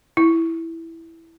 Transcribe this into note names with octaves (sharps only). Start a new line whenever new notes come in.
E4